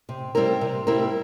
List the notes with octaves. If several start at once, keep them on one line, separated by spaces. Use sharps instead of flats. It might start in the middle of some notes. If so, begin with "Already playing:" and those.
C3
G3 C4 E4 A#4
C3
G3 C4 E4 A#4